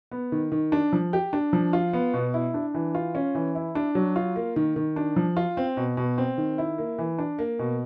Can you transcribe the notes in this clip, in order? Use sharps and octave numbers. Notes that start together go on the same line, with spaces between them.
B3
D#3
D#3
D4
F3
G4
D4
F3
F4
B3
B2
E4
D4
E3
F4
C#4
E3
E4
D4
F#3
F4
A#3
D#3
D#3
D4
F3
F4
C4
B2
B2
C4
D#3
E4
A#3
E3
D4
A#3
B2